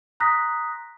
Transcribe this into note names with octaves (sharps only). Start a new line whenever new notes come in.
A#5 C6 D#6 F#6 A#6 B6